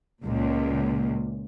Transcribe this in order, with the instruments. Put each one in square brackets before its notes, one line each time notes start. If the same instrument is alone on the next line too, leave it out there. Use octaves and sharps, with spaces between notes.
[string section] C#2 A#2